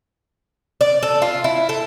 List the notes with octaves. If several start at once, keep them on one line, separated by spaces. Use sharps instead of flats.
D5
A4
F4
E4
A4